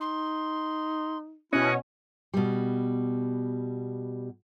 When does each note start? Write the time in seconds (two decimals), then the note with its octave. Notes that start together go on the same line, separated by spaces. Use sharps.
0.01 D#4 C6
1.53 B2 C#4 E4 C#5 D#5 F#6
2.34 B2 G3